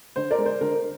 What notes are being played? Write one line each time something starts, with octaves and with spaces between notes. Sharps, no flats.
D3 C5
A#4 D5
G#3
C5
D3 A#4